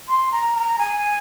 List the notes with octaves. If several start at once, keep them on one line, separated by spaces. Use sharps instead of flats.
C6
A#5
A#5
G#5